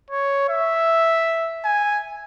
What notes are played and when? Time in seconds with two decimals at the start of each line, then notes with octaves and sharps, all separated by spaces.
0.11 C#5
0.49 E5
1.65 G#5